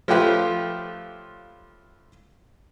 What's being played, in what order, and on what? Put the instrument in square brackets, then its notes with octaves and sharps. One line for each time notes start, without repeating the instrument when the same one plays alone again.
[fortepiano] F3 A3 C#4 F4 G4 B4